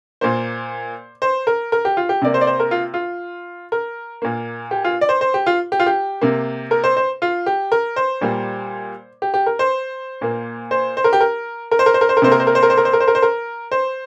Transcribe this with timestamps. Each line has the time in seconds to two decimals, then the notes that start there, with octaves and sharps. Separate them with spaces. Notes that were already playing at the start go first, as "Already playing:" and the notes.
0.21 A#2 A#3 C5
1.22 C5
1.47 A#4
1.72 A#4
1.85 G4
1.97 F4
2.09 G4
2.22 C3 A#3 D5
2.34 C5
2.41 D5
2.47 C5
2.60 A#4
2.71 F4
2.94 F4
3.72 A#4
4.22 A#2 A#3
4.71 G4
4.84 F4
5.01 D5
5.09 C5
5.21 C5
5.34 G4
5.46 F4
5.72 G4
5.80 F4
5.86 G4
6.22 C3 A#3
6.71 A#4
6.84 C5
6.97 C5
7.22 F4
7.46 G4
7.72 A#4
7.96 C5
8.21 A#2 G3 A#3
9.22 G4
9.34 G4
9.46 A#4
9.59 C5
10.21 A#2 A#3
10.71 C5
10.97 C5
11.04 A#4
11.13 G4
11.20 A#4
11.71 A#4
11.79 C5
11.86 A#4
11.94 C5
12.01 A#4
12.09 C5
12.17 A#4
12.22 C3 A#3 C5
12.32 A#4
12.40 C5
12.47 A#4
12.55 C5
12.63 A#4
12.70 C5
12.78 A#4
12.85 C5
12.93 A#4
13.00 C5
13.08 A#4
13.15 C5
13.22 A#4
13.72 C5